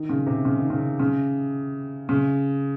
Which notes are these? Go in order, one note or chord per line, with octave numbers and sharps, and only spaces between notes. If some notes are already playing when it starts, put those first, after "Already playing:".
Already playing: D#3
C#3
C3
C#3
D#3
C#3
C#3
C#3